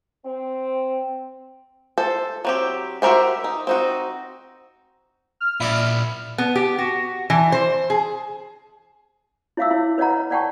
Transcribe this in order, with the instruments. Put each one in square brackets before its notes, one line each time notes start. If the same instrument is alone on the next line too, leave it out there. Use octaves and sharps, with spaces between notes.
[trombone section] C4
[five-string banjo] A4 C5
F#3 C4 G4
F#4 G4 A#4 C5 E5
D#4
C4 D#4 F#4
[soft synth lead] F6
[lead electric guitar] A#2 B5 [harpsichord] E4 D5
[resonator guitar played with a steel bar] B3
G4
F#4
E3
C5
G#4
[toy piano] E4 C#5 E5 F5 D6 E6
E4 C#5
B4 C#5 D#5 F#5 A#5
C#5
C#5 D5 F#5 G5 A5 C#6